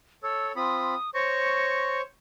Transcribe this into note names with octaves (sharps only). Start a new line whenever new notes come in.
A4 C#5 E6
C4 F4 B5 D#6
C5 C#5 C#6 A#6